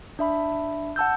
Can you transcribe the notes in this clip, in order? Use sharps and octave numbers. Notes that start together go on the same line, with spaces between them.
D4 E5 B5
F#5 A5 E6 G6